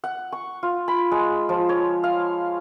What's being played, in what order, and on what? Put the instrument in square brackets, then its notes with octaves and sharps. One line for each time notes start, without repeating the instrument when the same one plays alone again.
[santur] F#5
C#6
F4
B5
G#3
F3
C#5
F5